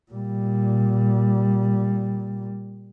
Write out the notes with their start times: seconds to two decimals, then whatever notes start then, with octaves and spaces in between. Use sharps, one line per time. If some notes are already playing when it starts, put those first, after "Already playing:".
0.11 A#2 G3